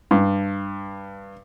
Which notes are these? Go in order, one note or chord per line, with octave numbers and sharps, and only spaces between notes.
G2